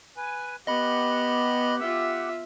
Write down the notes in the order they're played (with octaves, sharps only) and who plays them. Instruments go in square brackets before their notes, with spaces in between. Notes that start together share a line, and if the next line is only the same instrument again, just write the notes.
[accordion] B4 G#5
[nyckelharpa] B3 [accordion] G4 F#5 [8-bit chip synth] D#5 B5
[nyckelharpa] F4 E5